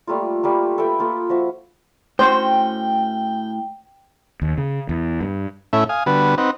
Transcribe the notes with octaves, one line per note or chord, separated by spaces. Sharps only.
G3 A3 A#3 F4
G3 A3 A#3
A4 B4 E5 G5
A#3 F4 A4
F3 F#4 E5
A2 C#4 F#4 C5 G5
D#2
C#3
E2
G2
A2 A3 C#4 E4 E5
F5 G#5 D#6
D3 G3 B3 F#4 B4
C4 D#4 B4 F#5